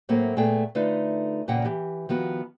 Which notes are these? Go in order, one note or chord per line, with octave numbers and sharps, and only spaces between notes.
A2 F#3 A3 A#3 C4
A#2 A3 B3 G#4 G5
D3 A3 D#4 F4 B4
E2 A#2 C#3 A#3 F#5 G5
E3 G4
D#3 F3 B3 F#4